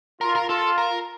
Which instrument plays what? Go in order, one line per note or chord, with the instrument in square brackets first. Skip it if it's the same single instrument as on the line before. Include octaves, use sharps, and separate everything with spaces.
[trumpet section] F4 [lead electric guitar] A#4
[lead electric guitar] A#4
[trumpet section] F4 [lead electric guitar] A4
[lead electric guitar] A#4